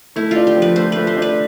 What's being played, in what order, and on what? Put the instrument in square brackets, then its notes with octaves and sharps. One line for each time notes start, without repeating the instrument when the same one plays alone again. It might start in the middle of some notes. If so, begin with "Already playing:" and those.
[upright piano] A3 [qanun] E4
[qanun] F4
[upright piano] D4
[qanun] G4
[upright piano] F3
[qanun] B4
[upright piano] A3 [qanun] C5
[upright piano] A3 [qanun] B4
[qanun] C5
[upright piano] D4
[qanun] B4